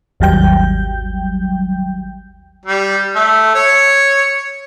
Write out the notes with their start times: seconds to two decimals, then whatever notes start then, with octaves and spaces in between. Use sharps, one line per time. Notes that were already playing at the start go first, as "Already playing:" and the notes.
0.20 G#1 D#2 F#3 G3 G5 G6
2.66 G3
3.16 A3
3.55 C#5